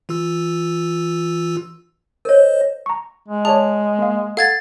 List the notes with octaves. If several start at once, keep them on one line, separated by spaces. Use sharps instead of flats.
E3 F4 E6
A#4 C5 C#5 D#5
A#5 C#6
G#3
G#4 C#5 D5 A5
A#3 F5
A4 F5 F#5 G#6 A6